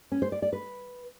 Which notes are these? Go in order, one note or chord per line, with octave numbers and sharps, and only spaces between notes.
C#4
C5
D5
D5
B4